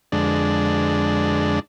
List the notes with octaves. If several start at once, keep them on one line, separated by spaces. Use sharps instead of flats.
F2 D3 G#3 D4